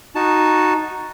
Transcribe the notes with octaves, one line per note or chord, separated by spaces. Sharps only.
D#4 F#4 A5